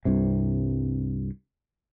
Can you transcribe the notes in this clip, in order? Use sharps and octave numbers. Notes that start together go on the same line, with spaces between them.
C2 G2 C3